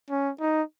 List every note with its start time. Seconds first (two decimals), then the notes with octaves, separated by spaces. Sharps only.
0.10 C#4
0.41 D#4